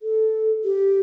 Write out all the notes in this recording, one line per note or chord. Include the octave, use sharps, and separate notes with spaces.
A4
G4